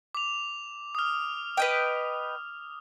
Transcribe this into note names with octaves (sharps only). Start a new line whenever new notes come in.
D6 F7
D#6 F6
B4 D#5 G5